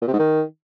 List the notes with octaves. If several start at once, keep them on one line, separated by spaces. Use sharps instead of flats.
A#2
C3
G#2
D#3